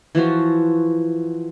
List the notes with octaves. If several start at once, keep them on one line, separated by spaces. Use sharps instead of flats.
E3 F3 F4 F#4